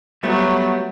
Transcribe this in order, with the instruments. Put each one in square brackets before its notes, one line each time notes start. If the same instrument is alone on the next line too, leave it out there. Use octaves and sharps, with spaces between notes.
[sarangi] F#3 [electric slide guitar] G3 A3 B3